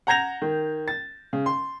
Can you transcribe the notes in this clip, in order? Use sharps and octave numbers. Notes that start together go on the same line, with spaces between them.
F#5 A#5 G6 G#6 A#6 F7
D#3
A6
C#3
C6